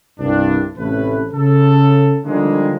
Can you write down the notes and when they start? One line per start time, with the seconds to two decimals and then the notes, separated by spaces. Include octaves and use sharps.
0.19 C2 G2 D4
0.78 A1 C3 A3 C#4 B4
1.33 C#3 A4
2.26 D3 D#3 F3 G3 G#3 A#3